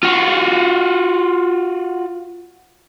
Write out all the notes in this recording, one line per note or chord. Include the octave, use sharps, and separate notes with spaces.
F4 F#4